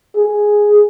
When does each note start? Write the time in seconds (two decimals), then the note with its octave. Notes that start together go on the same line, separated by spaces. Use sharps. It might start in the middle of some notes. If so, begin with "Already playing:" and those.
0.17 G#4